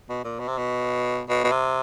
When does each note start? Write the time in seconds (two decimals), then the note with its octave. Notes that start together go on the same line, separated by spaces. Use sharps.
0.09 B2
0.24 A#2
0.39 B2
0.47 C3
0.57 B2
1.29 B2
1.44 B2
1.51 C3